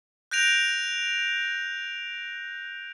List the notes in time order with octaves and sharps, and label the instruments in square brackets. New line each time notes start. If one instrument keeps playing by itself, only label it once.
[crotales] F#6 G6 A#6 D7 F7